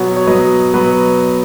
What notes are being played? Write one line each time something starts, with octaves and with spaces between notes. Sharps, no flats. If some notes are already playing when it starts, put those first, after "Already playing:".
Already playing: B2 F#3 B3 C#5 F#5
C#5
B2 F#3 B3 B4 D#5
B2 F#3 B3 F#4 B4